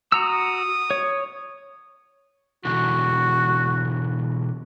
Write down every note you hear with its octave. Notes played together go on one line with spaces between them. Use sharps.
F#4 A#5 D#6 E6
C#5
B2 D3 E3 F#4